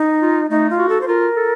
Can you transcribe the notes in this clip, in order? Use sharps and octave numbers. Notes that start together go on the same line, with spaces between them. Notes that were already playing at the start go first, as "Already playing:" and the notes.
Already playing: D#4
F4
A3 D#4
F4
F#4
A4
C5
F4 A#4
A4